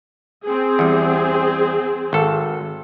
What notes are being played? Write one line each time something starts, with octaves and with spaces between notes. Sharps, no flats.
C4 G#4
E2 G3
G#1 A4